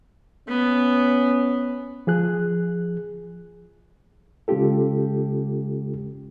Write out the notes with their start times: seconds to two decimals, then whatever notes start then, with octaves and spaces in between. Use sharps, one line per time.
0.48 B3 C#4
2.07 F3 G#4 F#6
4.48 C#3 G#3 C#4 F4 G4 A4